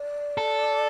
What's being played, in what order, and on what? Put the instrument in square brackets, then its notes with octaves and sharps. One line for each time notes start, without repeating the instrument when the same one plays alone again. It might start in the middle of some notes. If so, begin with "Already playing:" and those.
Already playing: [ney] D5
[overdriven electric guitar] A4